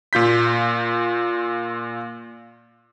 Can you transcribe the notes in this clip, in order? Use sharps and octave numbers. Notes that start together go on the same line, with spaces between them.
A#2 F4 G6 B6